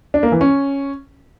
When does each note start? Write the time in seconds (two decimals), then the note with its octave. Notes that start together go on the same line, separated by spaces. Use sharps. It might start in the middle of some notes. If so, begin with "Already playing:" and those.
0.14 D4
0.23 A#3
0.32 E3
0.41 C#4